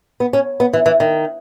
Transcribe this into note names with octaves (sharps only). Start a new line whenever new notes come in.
B3
C#4
B3
E3
E3
D#3